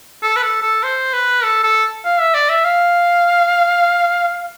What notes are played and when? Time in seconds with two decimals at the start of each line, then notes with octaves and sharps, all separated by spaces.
0.23 A4
0.36 B4
0.43 A4
0.62 A4
0.83 C5
1.13 B4
1.43 A4
1.64 A4
2.05 F5
2.19 E5
2.34 D5
2.50 E5
2.65 F5